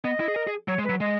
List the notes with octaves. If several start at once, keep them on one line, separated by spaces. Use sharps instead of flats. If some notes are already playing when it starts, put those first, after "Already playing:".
B3 D#5
E4
G#4
A#4
G#4
F#3 C#5
G#3
B4
F#3
G#3 D#5